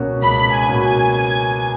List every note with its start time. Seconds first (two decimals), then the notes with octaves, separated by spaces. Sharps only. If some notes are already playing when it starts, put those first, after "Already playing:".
Already playing: C#2 B2 A#3 C#4 F#4
0.22 C#2 B5
0.52 G#5
0.66 B2 A#3 C#4 F#4
0.81 G#5